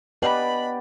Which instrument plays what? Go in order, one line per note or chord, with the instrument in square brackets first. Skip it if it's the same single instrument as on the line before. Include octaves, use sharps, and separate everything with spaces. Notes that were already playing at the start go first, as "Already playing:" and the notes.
[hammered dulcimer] B3 G4 [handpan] B4 D5 [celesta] D#5 G#5 F#7 [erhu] B5